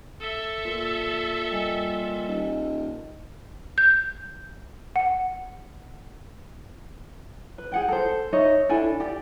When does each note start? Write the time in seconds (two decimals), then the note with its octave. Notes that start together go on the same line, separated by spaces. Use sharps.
0.20 A4 E5
0.65 A#2
1.51 G3 D#5 G#5
2.28 D#1 D#5
3.78 G6
4.96 F#5
7.58 B4
7.72 G#4 F#5 G5
7.88 A4 C5
8.33 D#4 C#5 D#5 E5
8.69 D4 E4 A4 G#5
9.00 G4 D5 G5